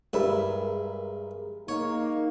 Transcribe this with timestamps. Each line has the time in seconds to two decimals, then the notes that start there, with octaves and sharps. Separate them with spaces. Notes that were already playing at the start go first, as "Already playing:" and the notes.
0.13 G2 G#3 A#4 E5 B5
1.68 A#3 D#4 C#5